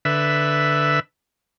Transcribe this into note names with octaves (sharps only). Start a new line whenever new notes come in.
D3 B4 E5